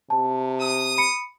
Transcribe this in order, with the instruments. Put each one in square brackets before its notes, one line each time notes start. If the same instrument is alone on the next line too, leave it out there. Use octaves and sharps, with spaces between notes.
[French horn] C3 [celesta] A5
[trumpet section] D#6
[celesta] B5 C#7